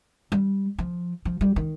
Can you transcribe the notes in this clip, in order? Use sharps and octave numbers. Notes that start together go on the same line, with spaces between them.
G3
F3
F3
G3
D#3